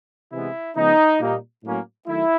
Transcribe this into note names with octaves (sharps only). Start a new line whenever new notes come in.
C3 E3 G#3 B3 E4
C#3 F3 G#3 B3 D#4
A#2 G3 A#3 D#4
A2 F#3 A#3 C#4
D#3 F#3 A3 E4